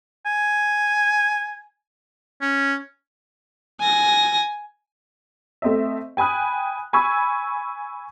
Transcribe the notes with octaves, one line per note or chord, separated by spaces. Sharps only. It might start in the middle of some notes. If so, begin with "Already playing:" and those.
G#5
C#4
G#5 A#6
A3 C4 D#5 E5
G5 G#5 B5 D#6 F#6
G#5 B5 C#6 E6 G#6